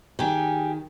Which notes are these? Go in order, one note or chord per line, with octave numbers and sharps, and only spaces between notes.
D#3 G4 G#4